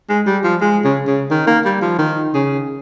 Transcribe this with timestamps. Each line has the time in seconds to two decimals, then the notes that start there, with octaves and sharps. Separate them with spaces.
0.09 G#3
0.26 G3
0.43 F3
0.61 G#3
0.84 C#3
1.07 C#3
1.30 D#3
1.47 A#3
1.65 G3
1.81 F3
1.98 D#3
2.34 C#3